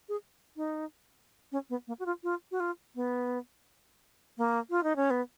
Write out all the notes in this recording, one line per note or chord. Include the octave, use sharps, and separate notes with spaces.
G#4
D#4
C#4
B3
A#3
F#4
F4
F4
F#4
F4
B3
A#3
F4
D#4
C#4
B3